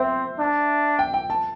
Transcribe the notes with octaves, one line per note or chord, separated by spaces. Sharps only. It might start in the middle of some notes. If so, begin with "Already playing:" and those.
Already playing: C4 C5 E5
D4
G5
G5
A5